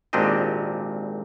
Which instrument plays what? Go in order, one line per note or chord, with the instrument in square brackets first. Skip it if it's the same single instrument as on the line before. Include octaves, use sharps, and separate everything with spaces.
[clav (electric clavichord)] G#1 A#2 C4 D4 G4 D#5